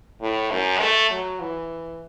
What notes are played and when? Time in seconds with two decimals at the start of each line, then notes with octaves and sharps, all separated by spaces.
0.21 A2
0.51 F#2
0.80 A3
1.10 F#3
1.40 E3